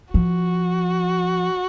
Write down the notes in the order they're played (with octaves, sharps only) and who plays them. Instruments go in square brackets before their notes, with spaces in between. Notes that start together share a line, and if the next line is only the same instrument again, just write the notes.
[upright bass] F3 [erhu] F#4